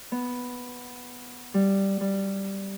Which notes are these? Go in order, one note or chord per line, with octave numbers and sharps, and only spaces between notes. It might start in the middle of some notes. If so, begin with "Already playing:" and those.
B3
G3
G3